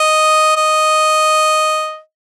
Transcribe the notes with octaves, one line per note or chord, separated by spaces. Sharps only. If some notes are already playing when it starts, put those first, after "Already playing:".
Already playing: D#5
D#5